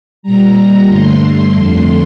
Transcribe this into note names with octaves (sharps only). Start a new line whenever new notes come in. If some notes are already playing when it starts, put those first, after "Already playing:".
A#2 G3 A#5
G2 D3 A3 C6
F2 D3 A3 C6